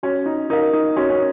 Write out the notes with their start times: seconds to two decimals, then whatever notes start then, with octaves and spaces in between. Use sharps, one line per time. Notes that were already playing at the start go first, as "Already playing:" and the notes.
0.03 C#4 F#4
0.26 D#4
0.50 D#4 A#4 F5
0.73 D#4
0.97 C#4 F#4
1.10 C#4